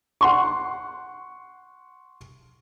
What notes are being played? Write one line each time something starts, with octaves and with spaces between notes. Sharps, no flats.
F#5 C6 C#6